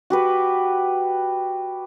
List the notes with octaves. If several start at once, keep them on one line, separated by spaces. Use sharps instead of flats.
F#4 G4 B4